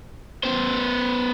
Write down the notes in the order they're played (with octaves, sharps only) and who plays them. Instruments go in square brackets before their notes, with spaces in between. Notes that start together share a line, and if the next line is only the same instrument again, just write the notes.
[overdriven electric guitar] B3 C5